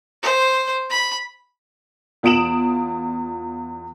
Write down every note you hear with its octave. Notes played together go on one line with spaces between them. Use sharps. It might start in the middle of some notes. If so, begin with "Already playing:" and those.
C5
B5
E2 F4 D#6 D7 E7 F#7